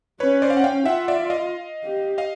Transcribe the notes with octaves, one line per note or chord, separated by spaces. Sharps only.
C#4 B4 C#5
C5 D5
F5
F#5
F5 G5
F4 E5 F#5
D5 E5
D#5 F5
G4
D#5 F5